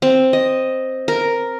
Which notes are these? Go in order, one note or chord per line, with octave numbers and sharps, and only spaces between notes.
C4
D#5
A#4